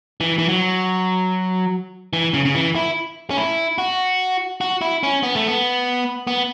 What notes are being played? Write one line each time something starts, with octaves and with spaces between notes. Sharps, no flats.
E3
E3
F#3
E3
C#3
C#3
E3
E4
C#4
E4
F#4
F#4
E4
C#4
B3
A3
B3
B3